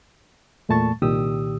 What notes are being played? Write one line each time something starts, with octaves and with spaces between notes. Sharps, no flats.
E2 A#2 A3 A5 C#6 A6
C2 A#2 D#3 G4 D#6 E6